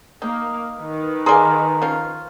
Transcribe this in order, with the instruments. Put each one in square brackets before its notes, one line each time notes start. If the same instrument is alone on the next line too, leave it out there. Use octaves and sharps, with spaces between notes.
[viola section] A#3 [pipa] D#4
[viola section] D#3 B4
[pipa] G#4 D5 F5 [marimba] G#5 C6 [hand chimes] A#5
[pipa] F3 C#4 F4